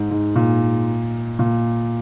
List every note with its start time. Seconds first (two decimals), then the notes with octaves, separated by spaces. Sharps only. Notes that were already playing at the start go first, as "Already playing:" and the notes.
Already playing: G#2
0.11 G#2
0.36 A#2
1.39 A#2